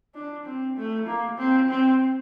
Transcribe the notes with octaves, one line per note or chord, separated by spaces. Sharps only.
D4
C4
A3
A#3
C4
C4